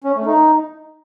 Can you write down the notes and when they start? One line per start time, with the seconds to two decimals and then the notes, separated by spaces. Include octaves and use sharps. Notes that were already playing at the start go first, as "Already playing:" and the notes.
0.04 C#4
0.15 A3
0.26 D#4